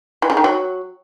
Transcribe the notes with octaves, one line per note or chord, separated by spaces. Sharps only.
E3
C#3
D#3
F#3